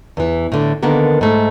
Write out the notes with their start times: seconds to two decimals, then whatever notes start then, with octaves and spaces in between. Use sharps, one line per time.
0.17 E2 E3
0.52 A2 D3
0.83 D3 D#3 A#3 B3 A#4
1.21 G#2 A3